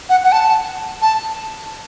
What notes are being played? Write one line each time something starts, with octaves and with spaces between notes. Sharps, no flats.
F#5
F#5
A5
A5